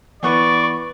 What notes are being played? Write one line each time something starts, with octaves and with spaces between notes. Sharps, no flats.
E3 B3 B4 D5 C#6